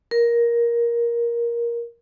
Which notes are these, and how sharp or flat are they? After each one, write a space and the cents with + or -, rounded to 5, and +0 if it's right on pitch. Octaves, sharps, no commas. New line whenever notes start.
A#4 +15